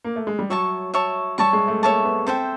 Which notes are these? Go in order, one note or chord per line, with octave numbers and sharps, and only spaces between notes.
A#3
A3
G#3
G3
F#3 C#5 E5 A5 C#6
C#5 E5 A5 C#6
G3 C#5 E5 A5 C#6
G#3
A3
A#3 C#5 E5 A5 C#6
B3
C4 A4 C5 E5 G5